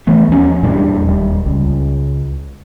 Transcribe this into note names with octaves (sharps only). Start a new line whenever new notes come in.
E3 A3 B3
D#2 F3 C#4
E2 A#2 G3 D4
D#1 G3
C#2